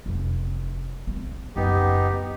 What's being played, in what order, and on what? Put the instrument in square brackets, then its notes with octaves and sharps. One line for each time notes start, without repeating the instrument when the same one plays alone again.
[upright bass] F1
C4
[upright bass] F#1 [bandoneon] B3 D#4 G4